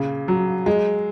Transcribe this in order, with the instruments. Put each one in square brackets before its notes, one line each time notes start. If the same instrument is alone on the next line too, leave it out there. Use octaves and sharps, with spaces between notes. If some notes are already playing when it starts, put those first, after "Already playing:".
Already playing: [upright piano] A#2 C#3
F#3
G#3